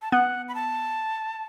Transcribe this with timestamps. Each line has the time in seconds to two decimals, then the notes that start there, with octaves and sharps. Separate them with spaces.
0.02 A5
0.12 B3 F#5
0.48 B5
0.55 A5